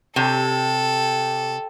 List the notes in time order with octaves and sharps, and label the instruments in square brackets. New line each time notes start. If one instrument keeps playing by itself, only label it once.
[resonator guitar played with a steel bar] C3 [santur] G4 C#5 G5 [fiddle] A4